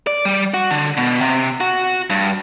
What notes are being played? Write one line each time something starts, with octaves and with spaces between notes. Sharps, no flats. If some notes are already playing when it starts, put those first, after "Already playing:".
D5
G3
F#4
D3
B2
C3
F#4
G2